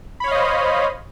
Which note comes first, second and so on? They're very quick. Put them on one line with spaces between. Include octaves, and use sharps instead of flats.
B5 C#5 F5 D#5 C5